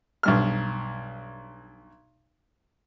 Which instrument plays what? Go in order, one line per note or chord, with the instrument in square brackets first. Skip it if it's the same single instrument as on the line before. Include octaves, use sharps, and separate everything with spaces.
[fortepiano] B1 G2 F6